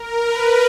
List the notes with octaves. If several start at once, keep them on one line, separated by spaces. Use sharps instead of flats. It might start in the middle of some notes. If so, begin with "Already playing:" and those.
Already playing: A#4
B4